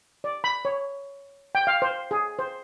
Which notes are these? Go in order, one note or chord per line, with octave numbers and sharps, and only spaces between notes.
D5
B5
C#5
G5
F5
C5
G#4
C5